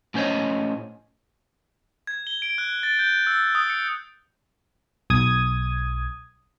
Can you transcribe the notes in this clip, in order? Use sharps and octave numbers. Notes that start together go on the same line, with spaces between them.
A2 C#4 C5 C#5 D#5
G#6
G7
D7
F#6
A6
G6
E6
D#6
C#7
B1 D#6 G#6